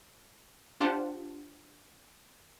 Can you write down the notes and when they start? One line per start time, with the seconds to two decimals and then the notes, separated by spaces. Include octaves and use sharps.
0.80 D4 F4 G4 C5 F#5 A5